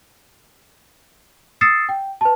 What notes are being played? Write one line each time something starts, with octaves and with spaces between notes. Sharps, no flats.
D#6 E6 A6 C7 C#7 E7
G5
B4 A5